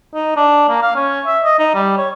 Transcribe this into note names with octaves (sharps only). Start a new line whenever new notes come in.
D#4
D4
A#3
F5
C#4
E5
D#5
D#4
G3
C#5